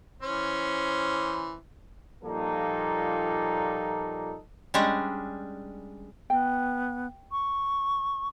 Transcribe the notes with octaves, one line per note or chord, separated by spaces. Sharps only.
E3 C#4 C5
A#2 F3 G3 A#3 D#4 A4
G3 G#3 C#4 D4
B3 G5
C#6